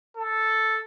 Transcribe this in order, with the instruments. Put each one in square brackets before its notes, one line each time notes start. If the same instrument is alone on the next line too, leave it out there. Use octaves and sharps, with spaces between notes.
[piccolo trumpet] A4